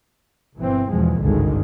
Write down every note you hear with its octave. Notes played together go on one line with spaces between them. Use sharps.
G1 B2 E3 C4
E2 G#2 B2 F3 G#3
G#1 C#2 G2 D3 D#3 G#3